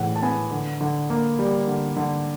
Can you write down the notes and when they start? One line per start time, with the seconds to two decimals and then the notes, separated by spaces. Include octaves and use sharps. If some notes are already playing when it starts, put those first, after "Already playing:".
Already playing: A2 E3 G#3 F#5
0.16 A5
0.22 B3 G#5
0.51 D3
0.81 D3
1.10 A#3
1.39 G3
1.68 D3
1.97 D3